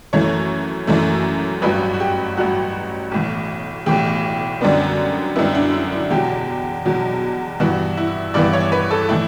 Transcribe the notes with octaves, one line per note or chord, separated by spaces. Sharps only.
F#2 E3 A3 C#5
F#2 E3 A3
A1 G2 F#3 B4
F#4
G4
A1 G2 F#3 F#4
B1 A2 E3
B1 A2 E3 G4
F#2 D3 G3 B3
F#2 D3 G3 B3 E4
D4
E4
E4
E2 B2 F#3 G4
E2 B2 F#3
G2 E3 B3 F#4
E4
G2 E3 B3 D5
C#5
B4
A4
A2 E3 E4